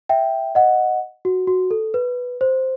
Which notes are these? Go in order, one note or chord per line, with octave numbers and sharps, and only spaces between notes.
E5 G5
D#5 F#5
F#4
F#4
A4
B4
C5